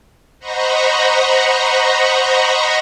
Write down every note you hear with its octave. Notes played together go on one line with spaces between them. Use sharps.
C5 D#5 F#5 A#5 B5 C#6